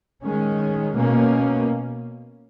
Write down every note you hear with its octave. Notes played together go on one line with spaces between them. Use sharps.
D#3 G#3 C#4
B2 A#3 C#4